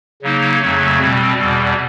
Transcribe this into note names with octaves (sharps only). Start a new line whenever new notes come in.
C#3 F#3 A#3 D#4
F2 C#3 F#3 A3
B2 G3 C4
E2 B2 G3